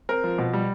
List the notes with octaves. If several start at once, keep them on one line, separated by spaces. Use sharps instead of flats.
C4 A#4
F3
B2
G3